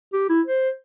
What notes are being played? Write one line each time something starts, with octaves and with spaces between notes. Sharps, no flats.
G4
E4
C5